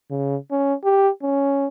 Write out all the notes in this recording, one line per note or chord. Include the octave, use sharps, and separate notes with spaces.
C#3
C#4
G4
C#4